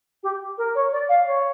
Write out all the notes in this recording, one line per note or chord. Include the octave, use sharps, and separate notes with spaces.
G4
A#4
C#5
D5
F5
C#5